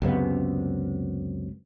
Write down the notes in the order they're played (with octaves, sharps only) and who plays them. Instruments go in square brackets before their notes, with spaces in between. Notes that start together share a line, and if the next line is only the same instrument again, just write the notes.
[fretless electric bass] C#2 F#2 C3 B3